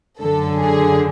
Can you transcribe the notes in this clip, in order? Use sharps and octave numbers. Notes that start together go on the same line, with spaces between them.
F#2 D3 A4
G#4